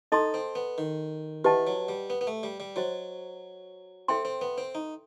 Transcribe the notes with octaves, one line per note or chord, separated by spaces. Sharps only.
D#4 A4 D#5 A5 C6
C4
B3
D#3
E3 G4 B4 D#5 F#5 A5
F#3
G3
B3
B3
A3
G3
G3
F#3 F#4 C5 D#5
C4 A4 E5 G5 C6
C4
B3
C4
D#4